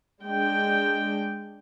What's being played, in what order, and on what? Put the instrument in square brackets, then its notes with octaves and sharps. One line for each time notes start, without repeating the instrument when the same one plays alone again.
[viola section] G#3 D4 G5